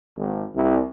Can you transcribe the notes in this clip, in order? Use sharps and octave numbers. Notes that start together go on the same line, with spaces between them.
G#1
C2